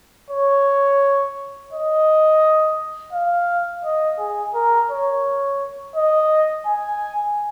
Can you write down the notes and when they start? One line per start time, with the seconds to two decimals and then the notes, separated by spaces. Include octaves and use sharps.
0.30 C#5
1.73 D#5
3.13 F5
3.85 D#5
4.19 G#4
4.55 A#4
4.90 C#5
5.96 D#5
6.66 G#5